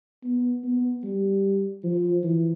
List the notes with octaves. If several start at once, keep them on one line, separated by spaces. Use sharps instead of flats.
B3
B3
G3
F3
E3